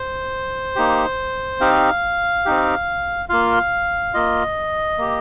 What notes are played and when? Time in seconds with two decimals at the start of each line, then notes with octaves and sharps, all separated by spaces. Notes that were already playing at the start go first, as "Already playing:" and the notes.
Already playing: C5
0.76 A#3 D#4 G4
1.60 C4 D#4 G4 F5
2.46 C4 D#4 G4
3.29 A#3 F4 F5
4.14 A#3 F4 D#5
4.98 A#3 G4